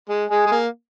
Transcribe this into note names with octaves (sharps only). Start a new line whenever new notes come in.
G#3
G#3 G#4
G#3
A#3